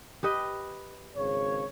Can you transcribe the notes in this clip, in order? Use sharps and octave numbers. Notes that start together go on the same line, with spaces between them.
G4 B4 D#5
G#1 C#3 C#5